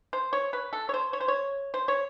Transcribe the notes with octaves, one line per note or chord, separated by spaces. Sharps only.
C5
C#5
B4
A4
C#5
C5
C#5
C5
C#5
C5
C#5